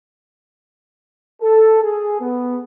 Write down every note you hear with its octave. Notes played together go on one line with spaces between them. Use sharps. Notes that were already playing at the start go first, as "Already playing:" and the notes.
A4
G#4
B3